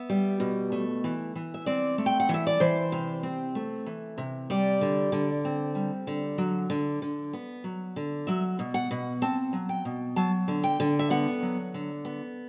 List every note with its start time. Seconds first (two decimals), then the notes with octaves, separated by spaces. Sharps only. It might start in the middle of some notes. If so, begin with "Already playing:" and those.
Already playing: B3 E5
0.10 G3
0.40 B2
0.72 A3
1.04 E3
1.36 E3
1.54 E5
1.66 C4 D5
1.98 A3
2.06 G5
2.20 F#5
2.29 E3 E5
2.47 D5
2.60 E3 C5
2.92 C3
3.23 C4
3.55 A3
3.86 E3
4.18 C3
4.50 G3 D5
4.81 D3
5.12 D3
5.45 C4
5.75 G3
6.07 D3
6.38 F#3
6.70 D3
7.02 D3
7.33 B3
7.64 F#3
7.96 D3
8.27 F#3 E5
8.59 B2
8.74 F#5
8.91 B2
9.22 C4 A5
9.53 F#3
9.69 G5
9.85 B2
10.16 F#3 A5
10.48 D3
10.64 G5
10.80 D3
10.99 E5
11.10 B3 F#5
11.42 F#3
11.74 D3
12.05 B3